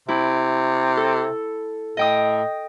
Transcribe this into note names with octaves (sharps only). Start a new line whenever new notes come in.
C3 E4
A4
A2 D#5 G5 D#6